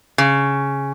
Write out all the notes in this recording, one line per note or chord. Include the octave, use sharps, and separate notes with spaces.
C#3